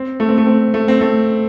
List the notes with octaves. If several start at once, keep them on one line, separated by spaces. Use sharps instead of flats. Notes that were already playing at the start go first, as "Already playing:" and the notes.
Already playing: C4
A3
C4
A3
C4
A3
C4
A3